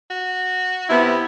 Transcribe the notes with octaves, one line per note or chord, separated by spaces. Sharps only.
F#4
C3 B3 E4